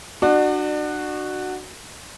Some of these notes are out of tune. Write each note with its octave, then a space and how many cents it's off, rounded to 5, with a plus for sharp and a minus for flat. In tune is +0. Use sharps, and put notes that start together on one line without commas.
D4 +35 F#4 +0 D5 +40